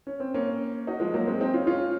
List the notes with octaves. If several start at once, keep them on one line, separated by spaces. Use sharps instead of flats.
C#4
C4
A#3 C#4
D#4 F#4
F3 G#3
F#3 A#3
G#3 C4
C4 D#4
C#4 F4
C#4 F4